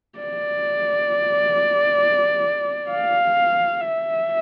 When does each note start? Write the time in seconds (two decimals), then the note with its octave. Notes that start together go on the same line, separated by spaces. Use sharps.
0.19 D5
2.90 F5
3.81 E5